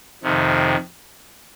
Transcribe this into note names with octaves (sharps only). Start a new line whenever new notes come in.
F2 C3 D#3